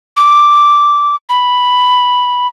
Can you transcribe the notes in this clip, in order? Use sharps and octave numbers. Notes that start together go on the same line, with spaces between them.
D6
B5